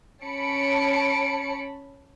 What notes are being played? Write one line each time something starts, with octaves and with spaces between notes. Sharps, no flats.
C#4 C#5 A5 B5 C#7 D7